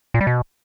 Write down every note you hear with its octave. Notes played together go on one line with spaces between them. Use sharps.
A#2
G3
B2